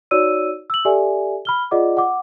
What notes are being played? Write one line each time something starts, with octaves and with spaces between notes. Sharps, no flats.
D#4 F#4 C#5 D5 E6 D#7
E6 F#7
G4 A4 D5 E5 G#5
B5 F6 G7
F4 G#4 D5 D#5 F#5 D6
F#5 D6